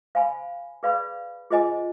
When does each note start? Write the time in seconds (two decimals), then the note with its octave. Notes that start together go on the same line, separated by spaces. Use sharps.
0.15 C5 F5 G#5 B5
0.83 G#4 B4 D5 F5 B5
1.51 F4 G#4 C5 D#5 G#5